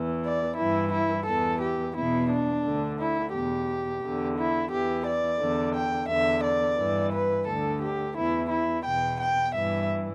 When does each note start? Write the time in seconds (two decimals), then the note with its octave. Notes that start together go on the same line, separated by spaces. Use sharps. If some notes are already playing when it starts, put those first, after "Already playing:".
Already playing: E2 E3
0.25 D5
0.58 G2 E3 E4
0.93 E4
1.27 E2 E3 A4
1.62 G4
1.96 E2 B2 E4
2.30 D4
2.66 D2 D3
3.00 E4
3.34 E2 B2 G4
4.03 E2 D3
4.38 E4
4.71 E2 E3 G4
5.07 D5
5.40 E2 D3
5.76 G5
6.09 E2 D3 E5
6.44 D5
6.79 G2 E3
7.13 B4
7.47 D2 D3 A4
7.82 G4
8.16 E2 E3 E4
8.50 E4
8.85 E2 B2 G5
9.20 G5
9.55 G2 E3 E5